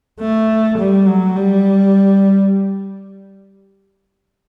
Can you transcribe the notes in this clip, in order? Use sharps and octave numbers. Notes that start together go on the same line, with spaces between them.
A3
G3
F#3
G3